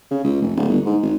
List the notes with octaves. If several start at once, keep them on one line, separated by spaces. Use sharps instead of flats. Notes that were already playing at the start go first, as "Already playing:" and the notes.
C#3
C#2
F1
D1
G1
G#2
G#1